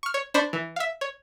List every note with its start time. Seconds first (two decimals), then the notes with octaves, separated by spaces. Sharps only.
0.03 C#6 F6
0.14 C#5
0.34 D4 C5 B5 C#6
0.53 E3
0.76 E5 F5
1.01 C#5